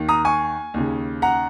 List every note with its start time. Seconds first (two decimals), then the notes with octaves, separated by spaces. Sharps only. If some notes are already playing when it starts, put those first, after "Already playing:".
Already playing: D#2 D#3
0.09 A#5 D#6
0.25 G#5 C#6
0.74 D#2 C#3
1.22 F#5 A#5